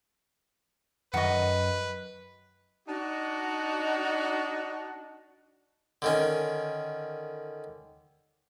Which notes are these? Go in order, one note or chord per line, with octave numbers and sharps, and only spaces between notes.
F#2 D#3 B4 D#5 F#5 C#6
D4 D#4 F#4
D3 D#3 C#4